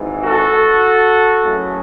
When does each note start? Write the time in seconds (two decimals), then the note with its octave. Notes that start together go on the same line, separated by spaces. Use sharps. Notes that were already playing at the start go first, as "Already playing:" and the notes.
Already playing: G#1 G#2 E3
0.26 F#4 A4
1.43 F#2 C#3 E3 A3